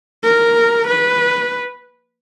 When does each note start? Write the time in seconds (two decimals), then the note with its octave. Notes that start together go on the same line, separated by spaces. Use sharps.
0.23 A#4
0.87 B4